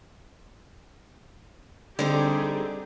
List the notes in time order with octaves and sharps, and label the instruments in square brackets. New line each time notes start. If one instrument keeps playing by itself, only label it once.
[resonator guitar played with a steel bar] D3 [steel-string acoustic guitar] G3 C4 D#4 [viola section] G4 G#4